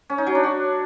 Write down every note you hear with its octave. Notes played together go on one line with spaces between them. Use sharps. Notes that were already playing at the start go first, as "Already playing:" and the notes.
C#4
D#4
F#3
D4
F#4